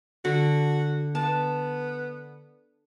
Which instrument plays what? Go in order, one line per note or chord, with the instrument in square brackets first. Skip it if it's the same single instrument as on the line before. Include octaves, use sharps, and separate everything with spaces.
[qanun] D3 [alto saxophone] F#4
[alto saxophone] B3 [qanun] A5